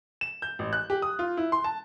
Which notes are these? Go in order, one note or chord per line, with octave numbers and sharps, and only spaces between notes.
E7
G6
A1
F#6
G4
D#6
F4
E4
C6
A5